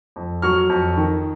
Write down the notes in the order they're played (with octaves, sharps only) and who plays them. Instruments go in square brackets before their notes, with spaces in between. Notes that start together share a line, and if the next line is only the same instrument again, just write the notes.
[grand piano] F2
F#3 C#6 F6
F2
D#3